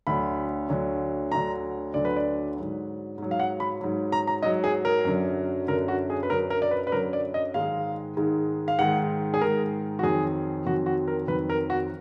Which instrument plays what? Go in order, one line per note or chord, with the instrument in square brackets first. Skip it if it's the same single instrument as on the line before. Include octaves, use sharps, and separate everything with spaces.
[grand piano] D2 D3 F#3 B5
D2 D3 F#3
D2 D3 F#3 A#5
D2 D3 F#3 D5
B4
D5
G#2 F#3
G#2 F#3
F5
F#5
B5
G#2 F#3
A#5
A#5
G#2 F#3 D#5
G#4
A#4
F#2 D3 F#3
F#2 D3 F#3 A#4
F#4
G#4
B4
F#2 D3 F#3 A#4
A#4
D5
B4
B4
F#2 D3 F#3 A#4
D5
D#5
G#2 D#3 G#3 F5
G#2 D#3 G#3
F5
G#2 D#3 G#3 F#5
G#4
G#2 D#3 G#3 A#4
F#4
F2 D#3 F#3 G#4
F2 D#3 F#3 F#4
F#4
A#4
F2 D#3 F#3 B4
A#4
F#4